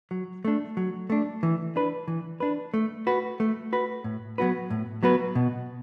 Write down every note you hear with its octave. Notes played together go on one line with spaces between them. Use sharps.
F#3
A3 D4
F#3
A3 D4
E3
D4 B4
E3
D4 B4
A3
F#4 B4
A3
F#4 B4
A2
F#3 B3 F#4 B4
A2
F#3 B3 F#4 B4
B2